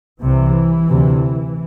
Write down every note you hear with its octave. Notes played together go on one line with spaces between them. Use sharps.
C2 C3 E3
D2 C3